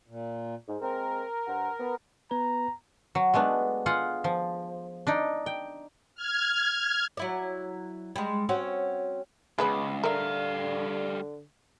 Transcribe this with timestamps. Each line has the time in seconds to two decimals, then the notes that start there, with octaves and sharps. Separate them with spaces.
0.08 A#2
0.68 G#2
0.81 G#3 A#3 C4 A#4
1.47 G2 C5 F#5
1.79 B3
2.31 B3 B4 A#5
3.15 F#3
3.34 G#3 A3 B3 D4
3.86 F4 G#4 F5 F#5
4.24 F3
5.07 D4 D#4 D5
5.46 G5
6.15 F6 G#6
7.17 F#3 E4 D5
8.16 G3 G#3
8.49 C4 C#4 F#4
9.58 C#2 G#2 G#3 B3 B4
10.04 D3 G3 A#4 E5 F5